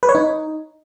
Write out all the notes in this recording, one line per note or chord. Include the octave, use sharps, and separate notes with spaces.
B4
C#5
D#4